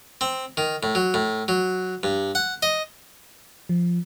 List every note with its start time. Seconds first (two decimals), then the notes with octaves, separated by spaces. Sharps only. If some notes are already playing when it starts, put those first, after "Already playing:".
0.21 C4
0.57 D#3
0.83 A2
0.95 F#3
1.14 A2
1.48 F#3
2.03 G2
2.35 F#5
2.63 D#5
3.69 F3